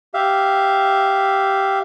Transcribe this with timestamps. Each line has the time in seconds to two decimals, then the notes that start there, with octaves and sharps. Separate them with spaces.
0.14 G4 E5 F5